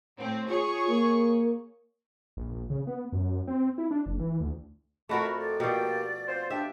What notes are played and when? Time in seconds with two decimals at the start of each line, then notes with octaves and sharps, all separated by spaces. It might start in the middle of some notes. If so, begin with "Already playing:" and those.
0.17 A2 C4
0.50 F4 G#4 C#5 C#6
0.89 A#3
2.37 A#1
2.53 A#1
2.70 C#3
2.87 B3
3.13 F#2
3.48 C4
3.78 E4
3.91 D4
4.06 F#1
4.20 E3
4.40 D2
5.09 F2 A3 F#4 A#4 A5 B5 C#6
5.37 D5
5.60 B2 F3 A#3 G4
6.28 C4 F4 C5
6.50 F3 D4 G4 E5